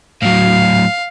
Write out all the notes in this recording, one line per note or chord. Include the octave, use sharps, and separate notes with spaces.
A2 F#3 F5